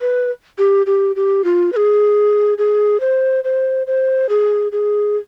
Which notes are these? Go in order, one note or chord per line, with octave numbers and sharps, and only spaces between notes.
B4
G4
G4
G4
F4
B4
G#4
G#4
C5
C5
C5
G#4
G#4